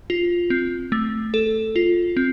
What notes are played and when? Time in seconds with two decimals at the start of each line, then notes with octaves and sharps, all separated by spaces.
0.10 F4
0.50 C4
0.92 A3
1.34 A4
1.76 F4
2.17 C4